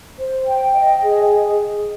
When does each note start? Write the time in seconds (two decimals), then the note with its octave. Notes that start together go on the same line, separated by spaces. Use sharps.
0.18 C5
0.46 G5
0.74 D#5
1.02 G#4